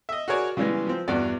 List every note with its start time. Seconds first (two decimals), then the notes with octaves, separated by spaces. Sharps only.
0.09 D#5 E5
0.28 F#4 G#4 A#4 C#5 D5
0.57 C#3 E3 G3 G#3 B3
0.87 F3 C4
1.08 E2 G2 F#4 D5